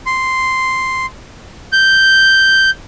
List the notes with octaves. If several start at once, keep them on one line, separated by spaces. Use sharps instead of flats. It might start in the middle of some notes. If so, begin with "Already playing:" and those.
C6
G6